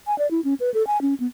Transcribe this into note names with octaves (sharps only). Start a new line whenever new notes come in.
G#5
D5
E4
C#4
B4
A4
G#5
C#4
B3